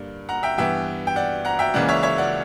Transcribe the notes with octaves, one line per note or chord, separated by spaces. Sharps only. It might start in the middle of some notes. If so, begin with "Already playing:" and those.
Already playing: G2 D3 A#3 D4
F#5 A#5
E5 G5
G2 E3 B3 E5 G5
G5
D5 F#5
F#5 A#5
E5 G5
C#2 C#3 E3 A#3 C#4 D5 F#5
C#5 E5
C#5 E5
D5 F#5